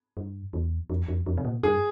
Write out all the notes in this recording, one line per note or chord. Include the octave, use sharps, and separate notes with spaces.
G2
E2
F2
F2
F2
C3
A#2
G2 G#4